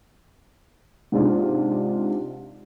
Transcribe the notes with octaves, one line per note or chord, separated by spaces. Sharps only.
G#2 C3 G#3 D4 F4